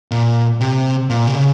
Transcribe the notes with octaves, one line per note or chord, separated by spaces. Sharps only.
A#2
C3
A#2
C3
C#3